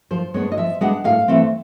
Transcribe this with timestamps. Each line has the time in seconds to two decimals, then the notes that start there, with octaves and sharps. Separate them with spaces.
0.11 F3 C5
0.34 G#3 B3 D4 C#5
0.52 D#5
0.58 F3 E5
0.81 G#3 B3 D4 F#5
1.04 A2 F5
1.28 E3 A3 C4